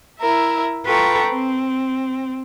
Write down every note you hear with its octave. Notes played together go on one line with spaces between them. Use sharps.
E4 A#4 E5
F4 A4 B4 G5 A#5 C#6
C4